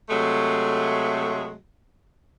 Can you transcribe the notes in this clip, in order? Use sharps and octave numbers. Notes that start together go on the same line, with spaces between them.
C3 F#3 G#3 A3